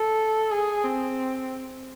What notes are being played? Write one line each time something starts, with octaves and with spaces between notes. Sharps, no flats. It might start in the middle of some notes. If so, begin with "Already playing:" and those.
Already playing: A4
G#4
C4